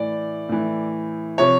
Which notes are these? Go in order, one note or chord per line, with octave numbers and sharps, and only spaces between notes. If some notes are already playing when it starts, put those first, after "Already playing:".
Already playing: A2 E3 D5
A2 E3
C3 F3 C#5